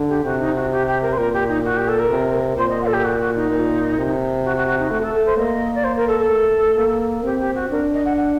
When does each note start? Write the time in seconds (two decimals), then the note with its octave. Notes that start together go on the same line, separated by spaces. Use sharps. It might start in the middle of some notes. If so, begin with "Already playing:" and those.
Already playing: D3
0.09 G4
0.24 C3 F#4
0.40 D#4
0.56 F#4
0.72 G4
0.87 G4
1.02 A#4
1.12 C5
1.17 A#2 A#4
1.33 G4
1.48 D#4
1.65 F#4
1.76 G4
1.88 A4
1.99 A#4
2.10 C3
2.57 A#2 C5
2.69 D#5
2.81 F#5
2.86 A4
2.93 G4
3.04 F#4
3.20 F#4
3.35 D#4
3.51 A#2
3.98 C3
4.44 F#4
4.56 F#4
4.67 F#4
4.79 D#4
4.90 A3 F#4
5.02 A4
5.14 A4
5.26 C5
5.38 A#3 D#5
5.75 D5
5.84 C5
5.96 A#4
6.08 A4
6.19 A4
6.30 A3
6.77 A#3
7.24 C4 G4
7.40 G4
7.55 F#4
7.70 D4 A#4
7.94 D#5
8.05 F#5
8.17 F#5